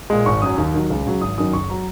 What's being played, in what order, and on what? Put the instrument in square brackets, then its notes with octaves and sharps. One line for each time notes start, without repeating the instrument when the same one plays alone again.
[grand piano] A#2 G#3
G#1 C#6
F#2 F#3 D#6
D#2
D#3 F#3
C#2
C#3 F#3
G#1 D#6
F#2 D#3 F#3 D#6
F#1 C#6
F#3 A#5